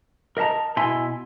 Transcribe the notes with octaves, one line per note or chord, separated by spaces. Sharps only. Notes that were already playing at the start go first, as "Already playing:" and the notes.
A#4 D#5 E5 A5 A#5
B2 E4 E5 G#5 C6